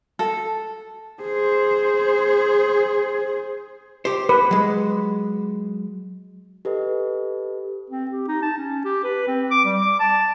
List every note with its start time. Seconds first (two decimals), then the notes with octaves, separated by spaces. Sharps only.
0.19 A4
1.22 G#4 C5
4.05 G4 C5
4.29 B4
4.51 F#3 G#3
6.65 G4 A4 B4 D#5
7.90 C4
8.11 G4
8.28 D#4
8.42 A5
8.57 C#4
8.85 G4
9.04 B4
9.27 C4
9.51 D6
9.65 G3
9.81 D6
10.00 A5